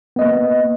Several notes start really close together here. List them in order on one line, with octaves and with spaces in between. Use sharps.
B3 D#5 A#3